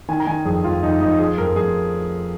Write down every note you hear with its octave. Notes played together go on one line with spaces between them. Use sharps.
D#3 G#5
A#5
D#3 G#5
F2 G#4
F2 F4
F2 D#4
F2 D#4
F3 G#4
F2 A#4
F2 G#4